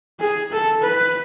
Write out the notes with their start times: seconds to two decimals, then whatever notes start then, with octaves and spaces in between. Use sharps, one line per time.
0.20 G#4
0.52 A4
0.83 B4